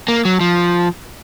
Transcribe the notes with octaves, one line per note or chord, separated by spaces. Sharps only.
A#3
F#3
F3